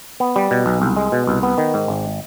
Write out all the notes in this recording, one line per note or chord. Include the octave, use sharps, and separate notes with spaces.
B3
G3
B2
B1
C2
G#3
B2
C2
B3
D#3
G#2
G#1